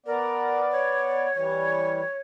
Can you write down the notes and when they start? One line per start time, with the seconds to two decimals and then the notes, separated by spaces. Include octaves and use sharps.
0.06 B3 A#4 D5
0.72 C#5
1.34 E3 G3 C#5